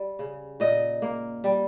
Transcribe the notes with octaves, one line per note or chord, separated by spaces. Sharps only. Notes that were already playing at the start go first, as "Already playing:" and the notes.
Already playing: G3
C#3
A#2 D#5
A#3
G3